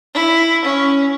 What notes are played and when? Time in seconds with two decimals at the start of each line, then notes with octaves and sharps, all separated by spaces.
0.14 E4
0.64 C#4